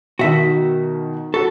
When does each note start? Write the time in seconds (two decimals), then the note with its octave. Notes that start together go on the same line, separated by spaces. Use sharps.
0.19 B2 D#3 F#4 E5
1.34 F#4 A4 C#6